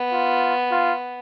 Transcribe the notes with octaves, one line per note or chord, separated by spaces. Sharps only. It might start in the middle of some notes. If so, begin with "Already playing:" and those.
Already playing: B3
F4
F4